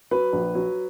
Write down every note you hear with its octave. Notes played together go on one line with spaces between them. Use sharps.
F#3 B4
A#1
F#3